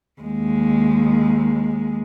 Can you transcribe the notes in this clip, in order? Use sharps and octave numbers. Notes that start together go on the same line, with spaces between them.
D#2 G#3